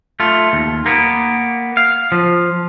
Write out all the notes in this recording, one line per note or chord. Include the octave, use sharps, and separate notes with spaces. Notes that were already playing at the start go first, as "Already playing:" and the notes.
A3 F4
D#2
A#3 B3
F5
F3